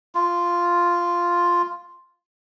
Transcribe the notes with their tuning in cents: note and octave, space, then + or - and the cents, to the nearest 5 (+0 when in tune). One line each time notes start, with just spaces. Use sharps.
F4 -5